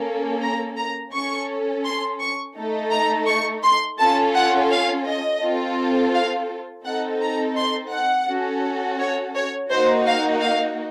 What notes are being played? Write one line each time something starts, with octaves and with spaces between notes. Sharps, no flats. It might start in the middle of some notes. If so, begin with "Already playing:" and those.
Already playing: A#3 C#4 A4
A#5
A#5
C#4 A4 C#6
C6
C#6
A3 D#4 A4
A#5
C#6
C6
C#4 F4 A4 A5
F#5
F5
D#5
C4 F4 A4
F5
C4 D#4 A4 F#5
A#5
C6
F#5
C#4 F#4 A4
C#5
C#5
A#3 D#4 F#4 C5
F5
F5